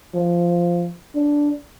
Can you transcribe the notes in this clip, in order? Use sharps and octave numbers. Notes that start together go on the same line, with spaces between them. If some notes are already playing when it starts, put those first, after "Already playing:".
F3
D4